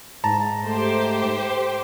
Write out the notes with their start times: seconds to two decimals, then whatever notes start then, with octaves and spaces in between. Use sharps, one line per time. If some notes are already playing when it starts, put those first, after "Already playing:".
0.24 G#2 A5 A#5
0.66 A3 G4 C5